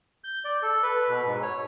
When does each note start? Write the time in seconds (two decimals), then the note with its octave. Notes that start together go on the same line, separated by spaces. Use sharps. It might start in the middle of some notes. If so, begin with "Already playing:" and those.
0.24 G6
0.45 D5
0.63 A4
0.83 B4
1.09 B2
1.27 G#2
1.42 C#5